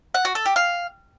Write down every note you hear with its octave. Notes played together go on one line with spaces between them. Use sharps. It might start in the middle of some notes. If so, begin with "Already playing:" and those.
F#5
F#4
A4
G4
F5